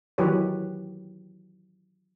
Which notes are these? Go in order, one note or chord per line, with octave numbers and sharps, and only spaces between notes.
D#3 E3 F#3 G4 B4 C#5